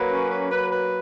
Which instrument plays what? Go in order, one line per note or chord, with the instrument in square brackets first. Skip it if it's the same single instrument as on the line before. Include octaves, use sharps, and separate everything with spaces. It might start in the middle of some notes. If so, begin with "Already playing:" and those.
Already playing: [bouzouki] F#3 A#3 [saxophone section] B4
[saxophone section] C#4
B4
B4
B4